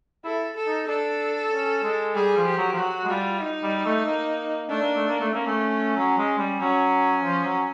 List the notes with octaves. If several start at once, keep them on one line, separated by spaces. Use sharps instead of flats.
E4 A4
A4
D#4
D4 A4
C#4
G#3
G3 G#4
F3
G4
F#3
F3
F#3 F#4
G#3
G3 F4
D#4
G3
A3
A#3
A3 D4
A#3
A3
A#3
A3
A#3 C#4
A3
F#3
G#3
G3
F#3 C#4
F3
F#3